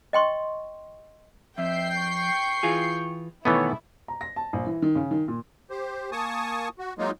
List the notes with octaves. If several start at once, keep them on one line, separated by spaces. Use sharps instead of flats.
D#5 G5 C6 C#6
F2 E5 G5 G6 C7
C#6
E3 F4 G#4
B2 D#3 E3 A3 B3 E4 C#5
A#5
A#6
A5
A#1
E3
D#3
C#3
D#3
A#2
G4 C5
A#3 G#5 A5 C#6 D#6
F#4
F#3 G#3 A#3 D#4 F4